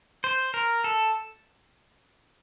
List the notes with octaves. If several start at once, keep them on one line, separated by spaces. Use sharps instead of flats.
C5
A#4
A4